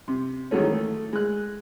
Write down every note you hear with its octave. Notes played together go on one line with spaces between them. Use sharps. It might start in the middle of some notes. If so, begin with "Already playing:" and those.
C3
D#3 E3 F#3 G#3 A3 C#4
A3
G#3 F#6